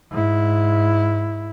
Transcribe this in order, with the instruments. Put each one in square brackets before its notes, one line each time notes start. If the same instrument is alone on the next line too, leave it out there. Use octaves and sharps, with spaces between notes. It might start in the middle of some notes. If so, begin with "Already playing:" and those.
[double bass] G#2 E4